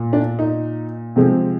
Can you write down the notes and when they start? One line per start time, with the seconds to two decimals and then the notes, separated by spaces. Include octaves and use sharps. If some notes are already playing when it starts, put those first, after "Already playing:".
Already playing: A#2
0.13 D4
0.39 D#4
1.16 C3 F3 G#3 C4